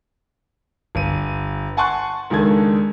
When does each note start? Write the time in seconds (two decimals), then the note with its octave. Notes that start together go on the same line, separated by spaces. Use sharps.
0.95 G1 D#7
1.77 F#5 G#5 A5 C6 C#6 F#6
2.30 C#2 D#3 D4 A4 G#6